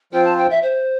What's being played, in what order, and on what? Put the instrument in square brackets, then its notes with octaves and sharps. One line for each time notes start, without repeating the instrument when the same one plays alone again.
[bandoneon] F3 C4 F4 C5 [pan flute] G5
[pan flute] A5
G5
E5
C5